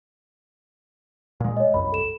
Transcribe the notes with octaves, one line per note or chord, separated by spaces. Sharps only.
A#2 G#3
C#5 D#5
C2 F#2 B5
A4 E7